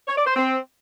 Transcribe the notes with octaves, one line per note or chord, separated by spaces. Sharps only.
C#5
D5
C5
C4